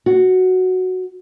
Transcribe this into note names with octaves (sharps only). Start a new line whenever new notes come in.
F#4